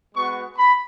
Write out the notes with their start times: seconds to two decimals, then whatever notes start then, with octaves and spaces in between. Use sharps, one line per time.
0.14 G#3 B3 F#4 C#6
0.58 B5